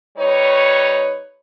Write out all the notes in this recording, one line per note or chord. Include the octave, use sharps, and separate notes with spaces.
G3 D#4 B4 C#5